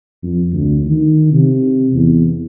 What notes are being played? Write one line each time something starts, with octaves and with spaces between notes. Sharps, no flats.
F2
D2
D#3
C3
E2